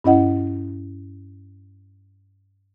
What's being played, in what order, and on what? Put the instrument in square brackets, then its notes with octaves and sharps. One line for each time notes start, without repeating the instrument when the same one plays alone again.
[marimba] G2 C#4 E4 D#5 F#5